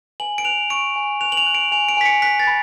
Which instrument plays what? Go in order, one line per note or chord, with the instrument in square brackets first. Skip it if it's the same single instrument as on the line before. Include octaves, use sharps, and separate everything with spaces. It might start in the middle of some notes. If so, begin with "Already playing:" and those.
[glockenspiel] G#5 F#7
D7
F#6 F7
C#6 D7
G#5
F#6 F7
F#7
F7
F#6
D7
G#5 F7
D7
G#5 B6
C#7
F#6 B6
A6
B5